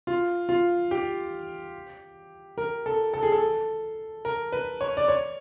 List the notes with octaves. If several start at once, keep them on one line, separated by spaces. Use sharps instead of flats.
F4
F4
G4
A#4
A4
A4
G#4
A4
A#4
B4
C#5
D5
C#5